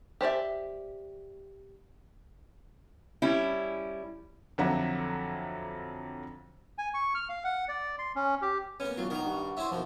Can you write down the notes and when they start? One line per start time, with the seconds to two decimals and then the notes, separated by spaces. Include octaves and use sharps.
0.21 G4 C5 D5 E5
3.22 G3 C#4 E4
4.58 F2 D3 F#3 E5 F#5 A#5
6.78 G#5
6.94 C#6
7.15 F6
7.29 F5
7.44 F#5
7.68 D5
7.99 C6
8.16 C#4
8.42 G4
8.80 A#3 B3 C#4
8.98 E1 F#3 F4 F#4 D5
9.10 D#3 D#4 A#4 A#5
9.26 G2 F#4 D5
9.57 C#4 E4 C5 E5
9.71 B2 D#3 F3